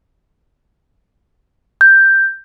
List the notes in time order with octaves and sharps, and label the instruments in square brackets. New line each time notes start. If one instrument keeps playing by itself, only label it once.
[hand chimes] G6